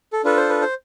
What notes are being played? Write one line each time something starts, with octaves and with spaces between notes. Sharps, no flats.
A4
D4 F4 A4 B4
C5
B4
C5